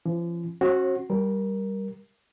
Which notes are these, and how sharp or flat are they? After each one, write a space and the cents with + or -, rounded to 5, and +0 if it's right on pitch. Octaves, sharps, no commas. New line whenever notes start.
F3 -40 C#4 -35
C#4 -40 F#4 +0 C5 +45
G3 -5 A#4 +10